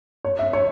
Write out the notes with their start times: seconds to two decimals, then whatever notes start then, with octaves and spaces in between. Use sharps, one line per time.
0.25 C#5
0.39 E5
0.53 C#5